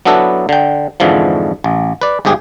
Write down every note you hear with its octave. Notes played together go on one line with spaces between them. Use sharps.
F#3 B3 D4 E4 A4 B4
D3 G5
F2 G#2 D3 E3 F3
A1
B4 D5
G1 G#2 G4 G#4